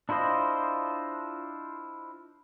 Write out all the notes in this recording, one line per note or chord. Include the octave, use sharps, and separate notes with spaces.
D4 E4 F4 C5 D#5